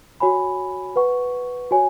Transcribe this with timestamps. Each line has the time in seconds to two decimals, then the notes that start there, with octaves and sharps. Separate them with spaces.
0.20 F#4 C#5 G#5 B5
0.96 B4 F#5 C#6
1.71 F#4 C#5 G#5